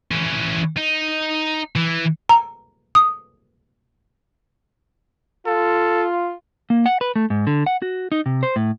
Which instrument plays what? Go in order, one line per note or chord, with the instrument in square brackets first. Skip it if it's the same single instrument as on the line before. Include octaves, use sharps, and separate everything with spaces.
[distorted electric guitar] E3 C#4
D#4
E3
[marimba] A#5
D#6
[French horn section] F4 [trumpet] A4
[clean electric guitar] A#3
F#5
B4
A3
G#2
D3
F#5
F#4
D#4
C3
C5
A2